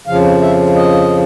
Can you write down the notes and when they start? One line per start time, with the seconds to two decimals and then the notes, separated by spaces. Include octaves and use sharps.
0.07 F2 C#3 F3 F5
0.42 E5
0.75 D#5